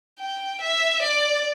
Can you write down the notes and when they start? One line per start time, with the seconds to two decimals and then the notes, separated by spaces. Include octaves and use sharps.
0.20 G5
0.61 E5
1.02 D5